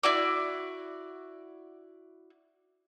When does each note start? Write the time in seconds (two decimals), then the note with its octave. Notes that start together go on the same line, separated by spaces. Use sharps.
0.03 E4 F#4 D5